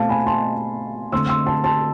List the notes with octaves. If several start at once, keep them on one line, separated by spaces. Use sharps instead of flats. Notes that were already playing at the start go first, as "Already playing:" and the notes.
Already playing: B2 A3 C4 F5 A5
G#5 B5
A5 C6
D3 A3 C4 C6 E6
C6 E6
A5 C6
A5 C6